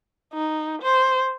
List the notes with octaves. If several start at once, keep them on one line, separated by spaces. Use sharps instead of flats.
D#4
C5